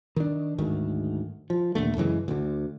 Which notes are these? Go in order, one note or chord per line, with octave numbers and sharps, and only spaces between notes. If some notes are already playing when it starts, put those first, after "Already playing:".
D#3 D4
D2 G#2 D#3
F3
D#2 A#2 D3 A3
F#2 C#3 E3 G#3
D2 D3